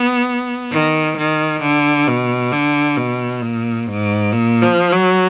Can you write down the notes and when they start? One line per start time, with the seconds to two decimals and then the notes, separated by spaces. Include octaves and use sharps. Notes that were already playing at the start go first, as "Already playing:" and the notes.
Already playing: B3
0.72 D#3
1.17 D#3
1.62 D3
2.07 B2
2.52 D3
2.97 B2
3.42 A#2
3.87 G#2
4.32 A#2
4.62 F3
4.92 F#3